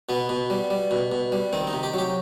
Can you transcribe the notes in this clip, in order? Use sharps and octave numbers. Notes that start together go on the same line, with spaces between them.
B2 B3
B2
G3
G3
B2
B2
G3
D#3 C4
D#4
C3
G4
F#3 G4